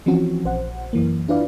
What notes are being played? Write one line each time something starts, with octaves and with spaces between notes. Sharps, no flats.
E3 F3 C4 C#4 F#4
A#1 C5 F#5
F#2 E3 A#3
D4 E4 F4 B4 D5 F5